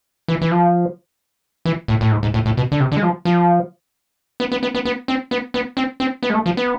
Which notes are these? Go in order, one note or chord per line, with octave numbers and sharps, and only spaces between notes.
E3
E3
F3
E3
A2
A2
G#2
G#2
A2
A2
B2
D3
C3
D3
G#3
F3
F3
B3
B3
B3
B3
B3
C4
B3
B3
C4
C4
B3
G#3
A3
F3
B3